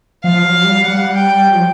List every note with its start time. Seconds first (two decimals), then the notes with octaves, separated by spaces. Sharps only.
0.24 F3 F5
0.44 F#3
0.65 G3
0.85 G3 F#5
1.16 G5
1.47 F#3
1.55 F3